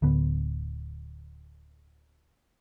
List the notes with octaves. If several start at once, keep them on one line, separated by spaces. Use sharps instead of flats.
D1 D3 B3